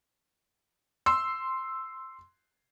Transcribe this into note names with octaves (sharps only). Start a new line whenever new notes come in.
C6 E6